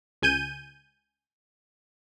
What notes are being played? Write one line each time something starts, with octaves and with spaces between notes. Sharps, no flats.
C#2 G#5 G6 D#7